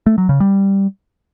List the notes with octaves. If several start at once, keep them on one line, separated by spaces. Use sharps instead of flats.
A3
F#3
C#3
G3